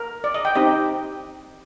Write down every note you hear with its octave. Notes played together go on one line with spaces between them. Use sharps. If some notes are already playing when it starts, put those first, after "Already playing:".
Already playing: A#4
D5
D#5
G5
C4 D#4 G4 D#5